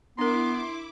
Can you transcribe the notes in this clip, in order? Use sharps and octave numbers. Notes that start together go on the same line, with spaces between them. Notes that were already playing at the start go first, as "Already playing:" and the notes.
B3 D4 E4 A#4 C6 D6